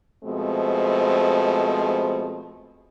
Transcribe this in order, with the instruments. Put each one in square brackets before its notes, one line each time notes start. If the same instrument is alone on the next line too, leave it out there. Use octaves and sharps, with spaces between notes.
[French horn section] B2 F3 G#3 A3 C4